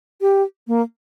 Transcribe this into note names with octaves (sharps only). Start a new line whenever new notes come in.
G4
A#3